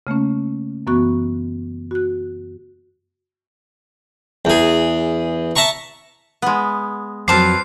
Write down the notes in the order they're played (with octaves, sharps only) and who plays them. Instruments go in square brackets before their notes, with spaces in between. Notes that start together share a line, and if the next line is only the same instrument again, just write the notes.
[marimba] C#3 A3 A#3 C#4
F#2 E3 B3 F#4 C#6 F#6
F#4 F#6
[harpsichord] E2 G#4
E5 A5 A#5 C#6
[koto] G#3 B3
[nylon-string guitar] F2 F#3 [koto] C4 A#4 [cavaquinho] B4 A5 D6 [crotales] C7